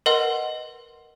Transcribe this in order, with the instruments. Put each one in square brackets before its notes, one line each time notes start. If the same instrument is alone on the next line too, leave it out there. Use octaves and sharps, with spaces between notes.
[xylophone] A#4 B4 D#5 F#5 C6